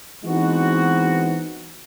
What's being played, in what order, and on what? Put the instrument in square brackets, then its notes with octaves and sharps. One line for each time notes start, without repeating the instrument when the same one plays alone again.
[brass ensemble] E3 G#3 B3 C4 D#4 F#4